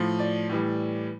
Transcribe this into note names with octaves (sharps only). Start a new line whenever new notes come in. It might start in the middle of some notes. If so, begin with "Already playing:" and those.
Already playing: A2 F3
D5
A2 E3 G3